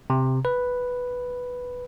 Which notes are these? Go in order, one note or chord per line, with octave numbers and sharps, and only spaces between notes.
C3
B4